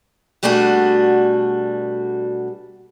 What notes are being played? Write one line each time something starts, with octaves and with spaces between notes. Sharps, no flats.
B2 G3 A3 D4 F#4 G#4